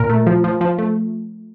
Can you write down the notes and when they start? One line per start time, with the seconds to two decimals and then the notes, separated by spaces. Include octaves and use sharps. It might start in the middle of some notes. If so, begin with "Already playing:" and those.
Already playing: A#2 A#4
0.09 A3
0.26 F3
0.44 F3
0.61 F3
0.78 A3